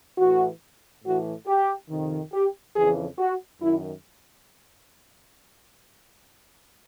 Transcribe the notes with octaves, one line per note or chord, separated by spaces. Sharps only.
A2 E3 F#4
A2 E3 F#4
G4
F2 C3 D#3
G4
F2 C#3 E3 G#4
F#4
F#2 D#3 E4